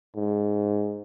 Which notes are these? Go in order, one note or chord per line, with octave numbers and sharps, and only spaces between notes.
G#2